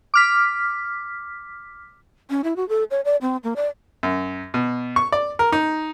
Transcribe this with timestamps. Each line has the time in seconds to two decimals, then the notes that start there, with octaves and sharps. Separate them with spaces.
0.14 D6 F6 B6
2.30 C#4
2.44 E4
2.56 F#4
2.69 A4
2.91 C#5
3.05 D5
3.21 C4
3.44 A#3
3.56 D5
4.03 F#2
4.54 B2
4.96 C#6
5.12 D5
5.39 A#4
5.52 D#4